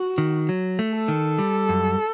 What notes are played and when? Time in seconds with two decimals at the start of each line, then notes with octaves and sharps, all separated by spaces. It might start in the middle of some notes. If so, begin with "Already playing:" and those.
Already playing: F#4
0.18 D#3
0.49 F#3
0.79 A3
0.94 A4
1.08 D#3
1.38 G3
1.69 F#2